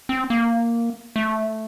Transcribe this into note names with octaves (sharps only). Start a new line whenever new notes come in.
C4
A#3
A3